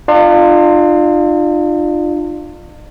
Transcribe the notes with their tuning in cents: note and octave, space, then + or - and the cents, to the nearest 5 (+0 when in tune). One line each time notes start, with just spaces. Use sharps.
D4 +45 F4 +0